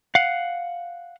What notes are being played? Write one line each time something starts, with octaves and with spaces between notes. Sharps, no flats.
F5 F#5